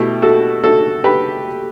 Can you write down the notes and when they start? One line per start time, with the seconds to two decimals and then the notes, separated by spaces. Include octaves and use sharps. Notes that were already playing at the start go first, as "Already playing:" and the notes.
Already playing: B2 A3 E4 G4
0.22 F#4 A4
0.64 F#4 A4
1.04 G4 B4